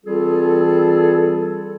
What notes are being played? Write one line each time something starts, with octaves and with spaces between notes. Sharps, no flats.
E3 G3 C4 F4 G#4 A4